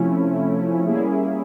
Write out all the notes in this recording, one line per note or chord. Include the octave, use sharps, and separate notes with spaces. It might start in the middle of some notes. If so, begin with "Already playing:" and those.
Already playing: C3 F3 A3 C#4 E4
G3 A#3 C#4 E4 G#4